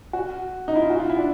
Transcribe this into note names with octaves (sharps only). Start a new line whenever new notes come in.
F#4
D#4
E4
F4
F#4
F4
E4
D4